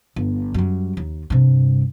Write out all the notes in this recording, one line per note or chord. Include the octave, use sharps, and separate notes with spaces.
G1
F#2 G3
D#2
G2 C3